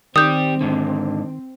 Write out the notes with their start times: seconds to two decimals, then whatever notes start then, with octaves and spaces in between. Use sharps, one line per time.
0.16 D#3 G3 C4 G4 D#6 G6
0.61 G#2 D3